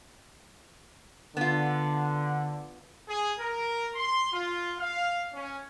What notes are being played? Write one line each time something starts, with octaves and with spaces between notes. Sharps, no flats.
D3 B3 F4
G#4
A#4
C6
F4
F5
C#4